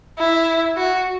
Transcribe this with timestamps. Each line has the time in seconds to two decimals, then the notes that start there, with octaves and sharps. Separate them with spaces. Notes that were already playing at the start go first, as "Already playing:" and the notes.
0.19 E4
0.77 F#4